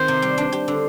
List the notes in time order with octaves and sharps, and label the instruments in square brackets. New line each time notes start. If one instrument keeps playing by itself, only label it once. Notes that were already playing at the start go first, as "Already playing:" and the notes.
Already playing: [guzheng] D#3 C4 [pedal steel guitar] C5
[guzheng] C3
G3
D4
G4
D3